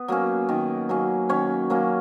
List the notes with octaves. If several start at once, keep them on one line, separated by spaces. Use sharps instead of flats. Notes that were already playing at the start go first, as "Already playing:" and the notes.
Already playing: B3
F#3 A#3 C#4
D#3
F#3 A#3 C#4
D#3 C#4 C#5
F#3 A#3 C#4